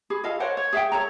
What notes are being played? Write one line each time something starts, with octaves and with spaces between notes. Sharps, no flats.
G#4 B5
F4 A4 D#5 F5
A#4 C5 C#5 F#5
C#5
G#4 E5 F5 G5
A4 C#5 A#5